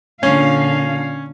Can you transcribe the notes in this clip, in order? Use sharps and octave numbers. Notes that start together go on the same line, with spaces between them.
A#2 D3 C#4 F5